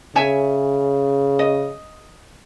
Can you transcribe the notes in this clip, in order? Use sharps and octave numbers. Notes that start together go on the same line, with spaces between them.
C#3 C#5 E5 G#5
D#5